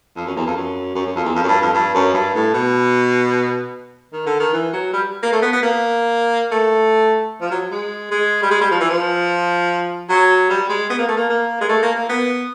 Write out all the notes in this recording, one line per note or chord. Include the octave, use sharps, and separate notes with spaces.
F2
F#2
E2
F2
F#2
F#2
F#2
F2
E2
F2
F#2
G2
F2
G2
F#2
G2
A2
B2
D#3
D3
D#3
E3
F#3
G3
A#3
A3
B3
B3
A#3
A3
F3
F#3
G#3
G#3
G3
G#3
G3
F3
E3
F3
F#3
G3
G#3
B3
A#3
A3
A#3
A#3
G#3
A3
A#3
A#3
B3